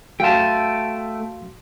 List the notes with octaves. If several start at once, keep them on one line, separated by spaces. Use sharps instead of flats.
A3 F#4 F5 G5 A5 C6